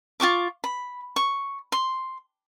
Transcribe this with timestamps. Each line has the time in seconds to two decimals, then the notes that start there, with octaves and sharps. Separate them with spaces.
0.20 F4 F#4 C#6 D6
0.64 B5
1.16 C#6
1.72 C6